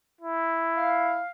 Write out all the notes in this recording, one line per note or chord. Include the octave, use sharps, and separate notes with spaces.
E4
F5